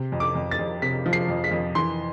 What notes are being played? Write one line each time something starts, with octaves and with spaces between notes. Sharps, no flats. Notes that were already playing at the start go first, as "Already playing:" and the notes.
Already playing: C3
F2
D6
F2
A6
F2
C3 B6
F3
C7
F2
B6
F2
E3 C6